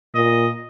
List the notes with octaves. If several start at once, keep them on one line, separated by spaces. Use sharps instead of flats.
A#2 D#5